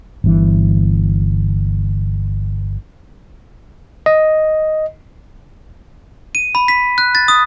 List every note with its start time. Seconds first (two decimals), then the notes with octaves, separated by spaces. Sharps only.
0.24 G1 G2 E3
4.06 D#5
6.35 D#7
6.55 B5
6.68 B6
6.98 F#6
7.15 A6
7.28 D#6